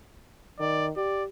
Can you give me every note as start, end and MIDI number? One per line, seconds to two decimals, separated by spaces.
0.59 0.91 51
0.59 0.87 74
0.97 1.28 67
0.97 1.23 74